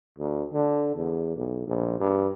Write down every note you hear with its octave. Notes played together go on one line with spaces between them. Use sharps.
D2
D3
E2
B1
A#1
G2